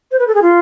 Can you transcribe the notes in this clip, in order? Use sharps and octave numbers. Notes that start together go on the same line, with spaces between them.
C5
B4
A4
G#4
F4